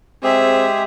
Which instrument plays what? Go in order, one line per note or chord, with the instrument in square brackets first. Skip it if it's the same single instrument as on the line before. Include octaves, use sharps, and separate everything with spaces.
[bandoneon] G#3 G4 [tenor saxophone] C4 [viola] G#4 E5